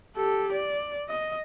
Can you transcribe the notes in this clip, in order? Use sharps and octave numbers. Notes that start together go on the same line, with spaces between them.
G4 A4
D5
D#5